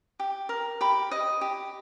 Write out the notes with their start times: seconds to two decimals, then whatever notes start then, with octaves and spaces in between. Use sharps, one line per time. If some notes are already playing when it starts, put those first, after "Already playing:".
0.20 G4
0.49 A#4
0.81 G4 B5
1.11 D#5
1.41 G4